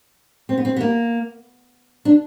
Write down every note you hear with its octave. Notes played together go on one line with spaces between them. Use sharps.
C4
B3
C4
B3
A#3
D4